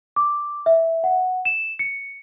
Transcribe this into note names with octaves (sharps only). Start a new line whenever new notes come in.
D6
E5
F#5
E7
C#7